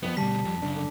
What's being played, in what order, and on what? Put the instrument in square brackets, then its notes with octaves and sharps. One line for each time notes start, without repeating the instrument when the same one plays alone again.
[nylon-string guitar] F2 D#3 F3 [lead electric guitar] B3
[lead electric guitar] D2 B2 [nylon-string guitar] G3 [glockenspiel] A5 B6
[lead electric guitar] F2 F3
[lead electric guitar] F#2 C#3 [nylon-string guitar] D4
[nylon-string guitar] D3